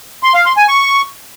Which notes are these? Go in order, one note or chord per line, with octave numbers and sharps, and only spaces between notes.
C6
F5
C6
G#5
C#6